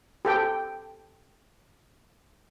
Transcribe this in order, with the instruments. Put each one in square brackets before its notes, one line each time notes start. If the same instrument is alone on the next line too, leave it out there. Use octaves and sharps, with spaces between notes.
[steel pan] G4 A4 G5